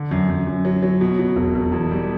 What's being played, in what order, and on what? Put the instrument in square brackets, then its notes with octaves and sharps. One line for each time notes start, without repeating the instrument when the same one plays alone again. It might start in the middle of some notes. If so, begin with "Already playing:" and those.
Already playing: [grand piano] D3
F#2
F#2
F#2
F#3
F#3
B2
B2
E1
E1
E2
G3